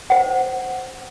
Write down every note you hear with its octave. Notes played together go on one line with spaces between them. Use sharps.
C5 F#5